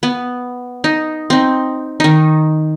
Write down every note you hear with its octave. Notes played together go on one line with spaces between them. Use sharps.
B3
D#4
C4 D#4
D#3 D#4